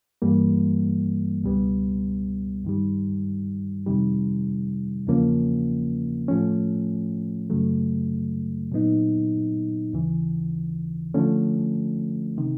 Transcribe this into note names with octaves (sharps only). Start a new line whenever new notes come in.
G2 E3 G3 A#3
C#2 B2 G3 B3
G2 D#3 G3
F2 C3 D#3 G3
E2 C#3 F3 A#3 C#4
A2 F3 A3 C#4
F#2 C#3 F#3 A3
A#2 F#3 B3 D#4
D#2 C#3 E3
D3 F3 A3 C#4
C3 D#3